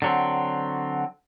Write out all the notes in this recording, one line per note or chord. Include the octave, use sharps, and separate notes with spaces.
D3 F#3 C4